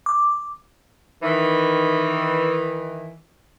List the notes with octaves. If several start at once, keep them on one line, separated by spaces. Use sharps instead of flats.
D6
D#3 E3